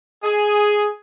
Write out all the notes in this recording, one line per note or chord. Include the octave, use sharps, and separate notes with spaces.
G#4